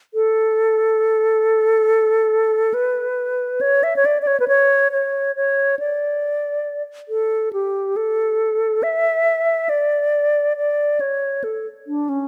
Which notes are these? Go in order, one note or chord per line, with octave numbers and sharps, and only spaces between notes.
A4
B4
C#5
E5
C#5
D5
D5
C#5
B4
C#5
C#5
C#5
D5
A4
G4
A4
E5
D5
D5
C#5
A4
D4
C#4